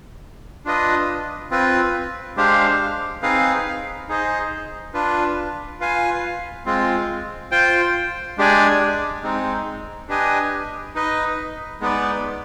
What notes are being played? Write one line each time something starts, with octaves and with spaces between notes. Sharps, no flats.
D4 F4 B4 D#5
C4 F4 B4
G#3 D4 G4 C5 F5
C4 D#4 G#4 B4 F5
D#4 G#4 C5 D#5
D4 F4 B4
F4 B4 F5 G#5
G#3 C4 F4
F4 C5 G5
G#3 D4 G4 D5 G#5
G#3 C4 D#4
D4 G4 B4 D#5 G#5
D#4 B4 D#5
G#3 B3 D#4 B4 D5